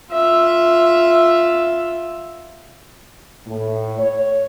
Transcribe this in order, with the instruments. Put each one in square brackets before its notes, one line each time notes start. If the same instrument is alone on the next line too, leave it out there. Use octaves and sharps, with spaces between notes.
[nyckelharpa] F4 E5
[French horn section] A2
C#5